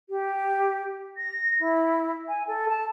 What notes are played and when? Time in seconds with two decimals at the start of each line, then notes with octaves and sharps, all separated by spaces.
0.09 G4
1.17 A#6
1.59 E4
2.28 G#5
2.47 A4
2.69 A5